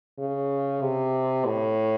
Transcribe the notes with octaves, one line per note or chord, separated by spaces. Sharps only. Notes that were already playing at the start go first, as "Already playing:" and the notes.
C#3
C3
A2